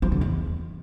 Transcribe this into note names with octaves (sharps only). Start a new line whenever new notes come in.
F3
D3
E2